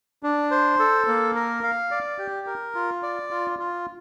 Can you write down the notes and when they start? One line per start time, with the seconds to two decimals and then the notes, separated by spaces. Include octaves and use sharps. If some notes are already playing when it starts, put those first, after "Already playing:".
0.23 D4
0.51 C5
0.79 A4
1.08 A#3
1.35 A#4
1.63 F5
1.91 D5
2.18 G4
2.47 A#4
2.75 F4
3.03 D5
3.31 F4
3.59 F4